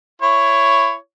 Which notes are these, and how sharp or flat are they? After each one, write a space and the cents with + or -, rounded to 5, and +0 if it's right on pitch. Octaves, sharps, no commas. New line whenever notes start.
E4 +20 C#5 +0